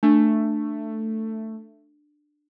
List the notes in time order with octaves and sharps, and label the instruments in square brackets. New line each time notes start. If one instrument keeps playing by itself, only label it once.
[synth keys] A3 [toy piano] D4